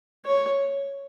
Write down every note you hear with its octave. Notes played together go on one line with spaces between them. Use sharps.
C#5